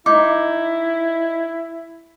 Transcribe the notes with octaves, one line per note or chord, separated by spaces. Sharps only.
D#4 E4 D6